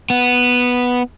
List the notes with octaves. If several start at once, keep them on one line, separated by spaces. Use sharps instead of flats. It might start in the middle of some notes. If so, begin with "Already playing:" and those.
B3